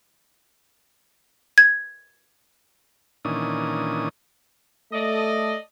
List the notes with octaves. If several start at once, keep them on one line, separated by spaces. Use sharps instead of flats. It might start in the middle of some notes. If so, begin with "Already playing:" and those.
G#6
A#2 D#3 E3 C#4 D4 D#6
A3 A4 D5 D#5